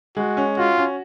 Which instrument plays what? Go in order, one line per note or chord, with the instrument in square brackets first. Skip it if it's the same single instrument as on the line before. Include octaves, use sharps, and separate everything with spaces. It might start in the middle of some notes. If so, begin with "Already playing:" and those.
[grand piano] G#3 [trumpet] F#4
[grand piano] C#4
[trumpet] F4 [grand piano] F#4
[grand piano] C#4